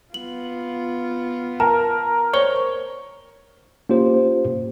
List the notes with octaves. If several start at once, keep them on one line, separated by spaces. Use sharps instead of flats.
B3 F4 F#7
A#4 A5
C5 C#5 G7
A#3 C#4 F4 G4 C5